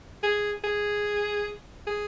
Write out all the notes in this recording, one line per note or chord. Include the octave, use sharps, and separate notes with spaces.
G#4
G#4
G#4